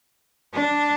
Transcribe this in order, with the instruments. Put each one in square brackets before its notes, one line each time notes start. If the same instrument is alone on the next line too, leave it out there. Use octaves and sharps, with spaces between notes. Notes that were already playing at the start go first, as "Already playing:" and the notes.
[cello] D4